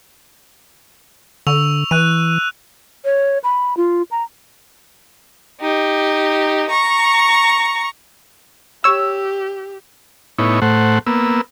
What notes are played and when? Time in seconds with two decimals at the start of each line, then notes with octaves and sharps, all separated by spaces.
1.47 D3 C#6 E6 F7
1.91 E3 F#6 D#7
3.05 C#5
3.44 B5
3.77 F4
4.11 A#5
5.61 D#4 G4
6.69 A#5 C#6
8.84 G4 C#5 E6
10.39 A2 B3 D#4 E4 C#5
10.62 A2 A3 C5 F#5
11.07 A#3 B3 E6